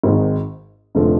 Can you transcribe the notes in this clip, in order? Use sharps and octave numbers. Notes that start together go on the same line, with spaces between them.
G#1 G#2 D#3
F1 D3 F3 A3